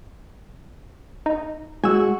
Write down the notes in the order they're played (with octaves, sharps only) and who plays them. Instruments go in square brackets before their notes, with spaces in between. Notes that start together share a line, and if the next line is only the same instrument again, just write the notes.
[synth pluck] D#4
[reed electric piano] G#3 [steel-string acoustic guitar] F#4 [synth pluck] G#5 E6